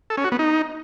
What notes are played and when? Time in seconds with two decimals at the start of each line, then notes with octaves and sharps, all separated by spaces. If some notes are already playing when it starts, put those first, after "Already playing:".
0.10 A4
0.17 C#4
0.25 F#4
0.32 B3
0.39 D#4